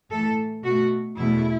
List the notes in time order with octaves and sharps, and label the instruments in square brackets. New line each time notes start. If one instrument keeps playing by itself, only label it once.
[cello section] A2 E3 A3 A4
B2 A3 F#4
E2 B2 A3 E4